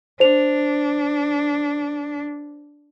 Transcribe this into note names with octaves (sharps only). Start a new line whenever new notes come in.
D4 C5 F7